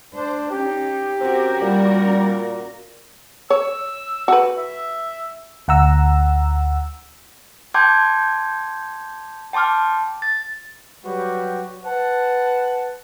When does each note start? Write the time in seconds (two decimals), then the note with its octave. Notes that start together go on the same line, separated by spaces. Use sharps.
0.16 D4 C5
0.51 C#4 D#4 G4
1.21 C4 C#4 F#4 A#4
1.62 A#2 G3
3.50 C#5 E6
4.28 F#4 B4
4.58 E5
5.68 D2 F#5 A#5 E6
7.74 G5 A5 C6 D6 G6 G#6
9.53 G5 A5 C6 D6 F6
10.22 A6
11.06 F#3 G3 F#4 G4 B4
11.85 B4 F#5 A5